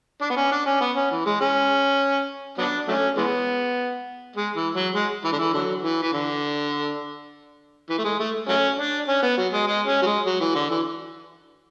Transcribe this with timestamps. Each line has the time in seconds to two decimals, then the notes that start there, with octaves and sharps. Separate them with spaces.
0.22 D4
0.30 B3
0.37 C#4
0.52 D4
0.66 C#4
0.81 B3
0.96 C#4
1.11 E3
1.26 G#3
1.41 C#4
2.58 F#3 B3 D4
2.88 F#3 A3 C#4
3.17 E3 G#3 B3
4.36 G#3
4.56 E3
4.75 F#3
4.95 G#3
5.24 E3
5.32 D3
5.39 E3
5.54 D3 F#3
5.83 E3
6.02 E3
6.13 D3
7.90 E3
7.98 A3
8.04 G#3
8.20 A3
8.49 F#3 A3 C#4
8.78 D4
9.08 C#4
9.23 B3
9.37 F#3
9.53 G#3
9.67 G#3
9.87 C#4
10.02 F#3
10.06 G#3
10.26 F#3
10.40 E3
10.55 D3
10.70 E3